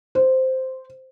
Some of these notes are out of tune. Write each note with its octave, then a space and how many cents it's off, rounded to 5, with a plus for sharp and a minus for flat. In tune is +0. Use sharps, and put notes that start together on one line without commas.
C5 -5